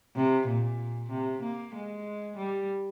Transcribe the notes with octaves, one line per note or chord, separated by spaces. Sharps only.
C3
A#2
C3
A#3
G#3
G3